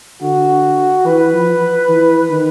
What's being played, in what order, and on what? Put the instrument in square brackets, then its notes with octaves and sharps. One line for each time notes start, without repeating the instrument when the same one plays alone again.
[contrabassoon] D3 [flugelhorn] F#4
[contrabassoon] E3 [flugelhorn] B4
[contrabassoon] F3
E3
D#3